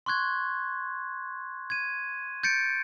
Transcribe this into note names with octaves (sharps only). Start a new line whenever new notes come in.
C6 C#6 F#6 G#6
G#6 D#7
G6 A6 C#7 D7